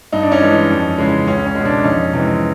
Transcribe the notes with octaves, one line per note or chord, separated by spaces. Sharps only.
G2 D#4
D4
C#4 D#4
E3 G#3
F2
C#3 E3 G#3
C#2 C#4
C#4
G#3
B2
D4
F2 C#4 D#4
C3 E3 G#3